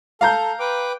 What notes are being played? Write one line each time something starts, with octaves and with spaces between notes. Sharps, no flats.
A4 F5 A#5 G6
B4 G5 D6